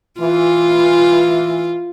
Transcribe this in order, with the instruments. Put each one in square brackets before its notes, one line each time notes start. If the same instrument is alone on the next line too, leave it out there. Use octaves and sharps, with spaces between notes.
[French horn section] E3 [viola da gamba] F4